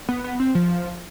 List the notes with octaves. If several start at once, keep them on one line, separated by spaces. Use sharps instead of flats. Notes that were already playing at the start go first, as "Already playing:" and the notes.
B3
B3
C4
F3